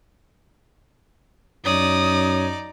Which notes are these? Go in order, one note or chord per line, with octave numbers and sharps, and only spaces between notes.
F#2 D#4 C#5 D5 D#6